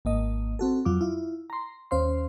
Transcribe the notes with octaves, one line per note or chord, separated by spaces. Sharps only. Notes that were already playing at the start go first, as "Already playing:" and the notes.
G#1 A#3 D#5
C4 F#4 A4
F2 F#3 F4 D6
E4 F4
A#5 C6
D#2 C#4 C5 F5 C6